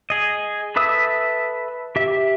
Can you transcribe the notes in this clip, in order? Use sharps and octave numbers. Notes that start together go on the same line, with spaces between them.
G#4 D#5
A4 B4 E5 D#6 E6
G4 E5